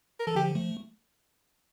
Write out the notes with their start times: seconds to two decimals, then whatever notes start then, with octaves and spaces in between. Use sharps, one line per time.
0.19 A#4
0.27 E3 A4
0.35 D3 F3 G4
0.55 F3 A3